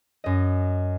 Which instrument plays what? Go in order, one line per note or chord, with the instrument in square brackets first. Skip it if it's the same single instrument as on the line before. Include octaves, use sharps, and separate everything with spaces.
[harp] F#2 D#5